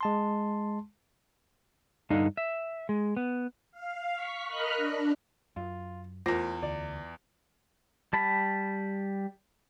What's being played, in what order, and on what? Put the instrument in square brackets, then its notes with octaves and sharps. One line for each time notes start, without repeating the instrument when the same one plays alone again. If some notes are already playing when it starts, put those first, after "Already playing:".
[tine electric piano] G#3 A5 C6
[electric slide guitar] G2 D3 D#4 F5
E5
G#3
B3
[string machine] F5
C#6 B6
A#4 D#5 A#5 B5 F6 F#6
D4
[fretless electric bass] F#2 [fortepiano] F4
[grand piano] E2 A#6 [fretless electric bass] A3 [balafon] F4 [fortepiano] A#4 C5
[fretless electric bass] D2 [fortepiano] D5
[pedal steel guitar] G3 A5 B5